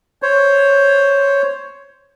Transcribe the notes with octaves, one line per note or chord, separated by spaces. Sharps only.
C5 C#5